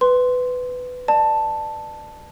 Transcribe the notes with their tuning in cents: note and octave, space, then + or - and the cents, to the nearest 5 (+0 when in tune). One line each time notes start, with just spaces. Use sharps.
B4 +15 C6 +0
D5 +35 A5 +0